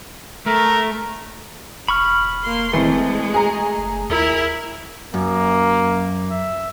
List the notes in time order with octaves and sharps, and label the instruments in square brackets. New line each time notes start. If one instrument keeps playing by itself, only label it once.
[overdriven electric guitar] A3 [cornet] A#4
[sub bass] E1 [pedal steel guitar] B5 C#6 F6
[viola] A#3 C6
[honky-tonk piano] E3 C4 [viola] G#3 [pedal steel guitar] A3
[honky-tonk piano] G#4 A#5
[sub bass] F#1
[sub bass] D#2 [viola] E4 A#4
[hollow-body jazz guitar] F#2 [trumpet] A#3
[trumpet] E5